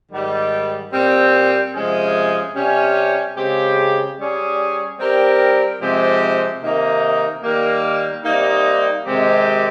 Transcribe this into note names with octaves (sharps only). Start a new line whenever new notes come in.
G#2 D#3 G3
A#2 G3 C4
C3 F3 G#3 C#4 G#4
C3 G3 C#4
C#3 G#3 C4 G4
G3 C#4 G#4
G3 C4 G4 A#4
C3 F3 G#3 C4 G4
C3 D#3 A#3 D#4 A#4
D#3 G3 A#3
C3 G3 A#3 D#4
C3 D#3 G#3 C4 G4